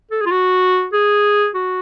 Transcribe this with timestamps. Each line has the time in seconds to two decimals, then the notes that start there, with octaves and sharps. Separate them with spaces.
0.11 A4
0.21 G#4
0.26 F4
0.32 F#4
0.93 G#4
1.55 F#4